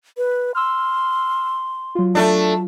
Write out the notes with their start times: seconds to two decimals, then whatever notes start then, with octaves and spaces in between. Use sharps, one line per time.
0.17 B4
0.55 C6 E6 F6
1.95 F#3 F4
2.15 A3 D4 A5